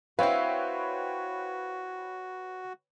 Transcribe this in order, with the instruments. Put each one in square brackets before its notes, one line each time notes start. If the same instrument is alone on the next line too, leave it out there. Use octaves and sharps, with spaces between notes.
[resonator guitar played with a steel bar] C4 E4 [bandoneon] F#4 [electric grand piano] B4 C#5 G5 [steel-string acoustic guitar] F5